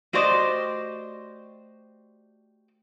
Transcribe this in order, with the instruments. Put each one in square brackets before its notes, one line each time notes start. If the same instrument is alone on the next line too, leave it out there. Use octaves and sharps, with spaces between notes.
[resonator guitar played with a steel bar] A3 F#4 G4 C5 D5 D#5